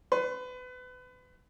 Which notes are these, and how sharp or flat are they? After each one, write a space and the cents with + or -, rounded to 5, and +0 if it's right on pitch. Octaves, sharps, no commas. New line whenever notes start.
B4 +30 C6 +15